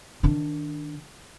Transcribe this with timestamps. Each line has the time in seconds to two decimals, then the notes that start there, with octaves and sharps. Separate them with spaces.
0.23 D#3 D4